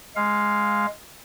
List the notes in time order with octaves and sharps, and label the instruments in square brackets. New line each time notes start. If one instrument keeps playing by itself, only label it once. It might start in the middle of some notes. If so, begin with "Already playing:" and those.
[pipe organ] G#3 F5